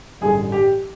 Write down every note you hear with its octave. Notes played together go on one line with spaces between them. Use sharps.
A1 G2 D3 G3 G#4
G4